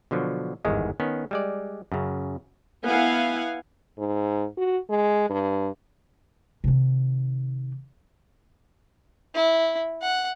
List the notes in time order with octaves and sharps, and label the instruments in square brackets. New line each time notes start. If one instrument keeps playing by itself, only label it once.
[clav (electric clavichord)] B2 D3 F3 F#3
G1 E2 G#2 D#3 G#3
D#3 B3 C#4
G3 G#3 D5
F#2 C#3
[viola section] B3 E4 F5 F#5 G#5
[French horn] G#2
F#4
G#3
G2
[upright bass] C3 D#3
[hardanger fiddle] E4
F#5